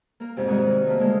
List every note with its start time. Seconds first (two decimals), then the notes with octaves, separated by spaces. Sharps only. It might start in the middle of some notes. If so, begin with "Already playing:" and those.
0.20 A#3 A#4
0.37 F2 G#2 C3
0.48 D#3 G3 G#3 F#4 G#4
0.67 A#4
0.87 A3 A#3
1.00 D3 G#3 A#3